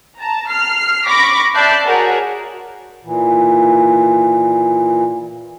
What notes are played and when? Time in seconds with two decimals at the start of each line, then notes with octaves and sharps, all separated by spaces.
0.19 A5 A#5
0.49 F6 C7
1.06 B5 C#6 D6 A#6 B6
1.54 D5 E5 A5 F#6 G6 C7
1.85 F#4 G#4 A#4 C#5 F#5
3.04 A#2 E3